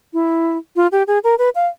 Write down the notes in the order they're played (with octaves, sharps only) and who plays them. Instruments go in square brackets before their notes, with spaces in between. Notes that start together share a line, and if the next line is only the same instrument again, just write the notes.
[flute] E4
F4
G4
G#4
A#4
B4
F5